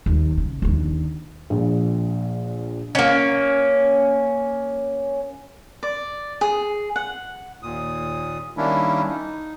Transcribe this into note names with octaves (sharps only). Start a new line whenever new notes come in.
D#2
C#3
D#2 D3
A#1 A#2
A#3 C#4
D5
G#4
F#5
D#2 A#2 D#6
D#3 G3 A#3 C#4 D4 E4
D#4